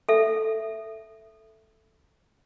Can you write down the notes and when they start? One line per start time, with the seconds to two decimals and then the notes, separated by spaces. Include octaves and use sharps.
0.09 A4 E5